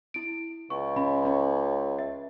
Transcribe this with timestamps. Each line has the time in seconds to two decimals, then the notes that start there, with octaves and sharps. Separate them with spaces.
0.14 E4 D7
0.70 C#2 C#6
0.96 C#4 B5
1.25 C#4 C#5
1.99 E5